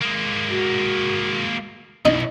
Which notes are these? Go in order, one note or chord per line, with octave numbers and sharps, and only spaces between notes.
G#3 A#3
F#4
B1 D#4 E4